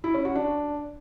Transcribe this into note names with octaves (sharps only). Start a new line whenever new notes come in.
E4
C#4
F#4
D4